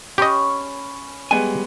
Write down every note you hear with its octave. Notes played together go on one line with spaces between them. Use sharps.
C#4 G4 D#5 B5 C#6
G3 G#3 B3 G#5